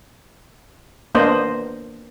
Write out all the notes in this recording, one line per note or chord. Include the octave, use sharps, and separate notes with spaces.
A#3 B3 D4 C5 D#5